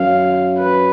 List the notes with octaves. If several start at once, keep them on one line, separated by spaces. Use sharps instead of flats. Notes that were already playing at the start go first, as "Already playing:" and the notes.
Already playing: F#2 F5
B4